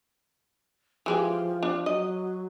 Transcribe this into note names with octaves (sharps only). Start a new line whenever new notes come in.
E3 F3 G#3 G4
D4
F#3 D#5